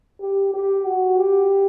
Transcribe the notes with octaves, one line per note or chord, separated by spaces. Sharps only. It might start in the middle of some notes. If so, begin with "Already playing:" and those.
G4
G4
F#4
G4